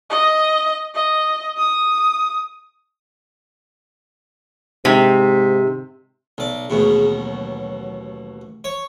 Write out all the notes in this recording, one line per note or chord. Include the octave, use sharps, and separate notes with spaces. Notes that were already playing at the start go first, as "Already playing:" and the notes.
D#5
D#5
D#6
G#2 C3
B1 D5
A1 D#2 B2 G#4
F#3
C#5